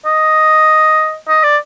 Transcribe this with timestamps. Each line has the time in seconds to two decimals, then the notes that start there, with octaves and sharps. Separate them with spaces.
0.06 D#5
1.28 D#5
1.43 D5